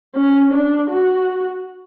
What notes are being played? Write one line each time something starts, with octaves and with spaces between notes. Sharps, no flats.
C#4
D4
F#4